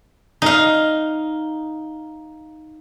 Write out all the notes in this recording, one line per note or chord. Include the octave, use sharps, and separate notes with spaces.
D#4 F5